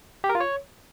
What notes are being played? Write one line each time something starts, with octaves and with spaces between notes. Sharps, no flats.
G4
A#4
F4
C#5